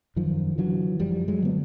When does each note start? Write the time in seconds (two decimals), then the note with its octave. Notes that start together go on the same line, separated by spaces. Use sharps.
0.16 F#2 D#3 F3
0.58 D3 E3 F#3
0.99 F#2 F3 G3
1.28 F#3 G#3
1.42 D3 B3